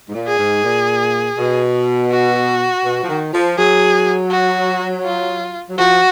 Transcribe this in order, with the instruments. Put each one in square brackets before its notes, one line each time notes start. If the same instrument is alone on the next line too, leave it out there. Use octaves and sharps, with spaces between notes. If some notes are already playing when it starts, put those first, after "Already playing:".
[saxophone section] G#2
A#2
[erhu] G#4
[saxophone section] G#2
A#2
B2
[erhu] F#4
[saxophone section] B2
F3
D#3
F3
[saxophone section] F#3 [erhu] G#4
[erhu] F#4
F4
[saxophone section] F#3
[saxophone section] F3 [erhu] F#4